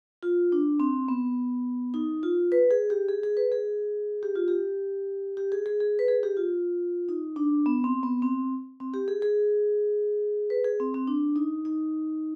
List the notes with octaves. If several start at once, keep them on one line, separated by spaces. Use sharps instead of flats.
F4
D4
C4
B3
D#4
F4
B4
G#4
G4
G#4
G#4
B4
G#4
G4
F4
G4
G4
G#4
G#4
G#4
B4
G#4
G4
F4
D#4
D4
B3
C4
B3
C4
C4
G4
G#4
G#4
B4
G#4
C4
C4
D4
D#4
D#4